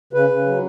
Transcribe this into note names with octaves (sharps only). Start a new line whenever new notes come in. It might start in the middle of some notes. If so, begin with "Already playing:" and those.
C#3 B4
C#3
F#3